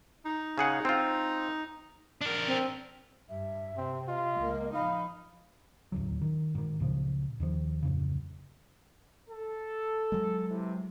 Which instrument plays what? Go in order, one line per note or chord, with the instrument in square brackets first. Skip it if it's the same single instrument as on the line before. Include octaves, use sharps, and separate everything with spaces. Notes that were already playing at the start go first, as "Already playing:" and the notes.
[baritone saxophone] D#4
[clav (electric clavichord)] C#3 G#4 F#5
C4 F4
[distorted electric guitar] D4 A#4
[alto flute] C4
[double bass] G2 [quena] E5
[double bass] C3 [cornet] C4
[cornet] F4 [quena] D#5
[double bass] C#2 A#3
[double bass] F3 D#4 [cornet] F5 [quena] B5
[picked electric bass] D#1 A1 D2 F#3
D#3
G#2 D#3
C#2 A#2 C#3 F3
D#2 D#3 F3
D1 F2 C#3
[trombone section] A4
[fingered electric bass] F#3 G#3
[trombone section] C3 E3